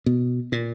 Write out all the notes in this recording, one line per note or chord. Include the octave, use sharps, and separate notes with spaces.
B2
A#2